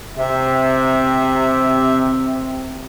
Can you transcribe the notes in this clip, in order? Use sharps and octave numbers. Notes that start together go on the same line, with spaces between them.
C3 E5